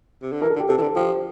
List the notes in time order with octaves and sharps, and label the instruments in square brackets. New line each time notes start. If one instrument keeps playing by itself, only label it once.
[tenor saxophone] C3
D3
[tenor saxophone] E3 [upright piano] A#4
[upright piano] A4
[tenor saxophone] D3
[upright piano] G4
[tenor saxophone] C3 [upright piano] A4
[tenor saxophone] E3
D3
[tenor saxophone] F3 [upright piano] G4